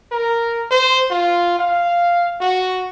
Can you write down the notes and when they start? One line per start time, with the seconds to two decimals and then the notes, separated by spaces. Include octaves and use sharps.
0.12 A#4
0.71 C5
1.10 F4
1.59 F5
2.41 F#4